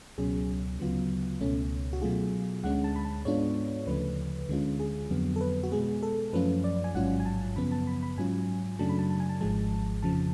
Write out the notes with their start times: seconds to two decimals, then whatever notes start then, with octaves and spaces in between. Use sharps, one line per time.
0.18 C#2 B2 F#3 C#4 G#4
0.79 D2 C#3 F#3 B3 F4
1.41 C#2 B2 A3 C#4
1.93 F#4
2.02 B2 F#3 A3 F4 G#4
2.64 D2 D3 G#3 C#4 F#5
2.84 A5
2.96 B5
3.05 A5
3.25 G#2 G#3 B3 D4 F4 C#5
3.87 D2 C#3 F3 A3 B4
4.48 D2 D3 G#3 C#4 F4
4.79 G#4
5.10 F2 D3 F#3 B3
5.36 A4
5.41 B4
5.63 F#4
5.72 B2 G#3 B3 G#4
6.03 A4
6.33 F#2 F3 A3 C#4 F4 B4
6.64 D5
6.84 G#5
6.95 A1 G#2 F#3 C#4 F4 F#5
7.20 G#5
7.25 A5
7.56 F#2 C#3 F3 B3 B5
7.72 A5
7.87 B5
8.03 B5
8.18 G#2 F#3 C#4 F4 G#5
8.79 F#2 C#3 F#3 A3 D4 A5
8.89 B5
8.99 A5
9.10 A5
9.20 G#5
9.29 A5
9.41 G#1 G#2 F3 G#3 A5
10.03 F2 C#3 F3 A5